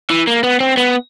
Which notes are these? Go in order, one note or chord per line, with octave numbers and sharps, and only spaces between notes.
E3
A#3
B3
C4
B3